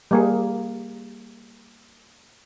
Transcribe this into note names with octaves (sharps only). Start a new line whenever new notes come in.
G3 A#3 G#4